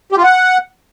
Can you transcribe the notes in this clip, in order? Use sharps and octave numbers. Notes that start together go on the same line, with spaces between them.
G4
F4
F#5